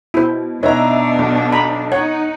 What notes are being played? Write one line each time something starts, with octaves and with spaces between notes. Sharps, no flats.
B2 E4 C5
B2 D4 D#4 B4 C#5 D#5 E5 A#5
B1
A#5 B5
D#4 C#5 F#5